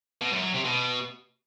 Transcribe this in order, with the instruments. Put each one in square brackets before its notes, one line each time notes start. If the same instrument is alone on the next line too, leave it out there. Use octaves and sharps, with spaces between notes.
[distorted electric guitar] B2
F#2
F#3
C3
B2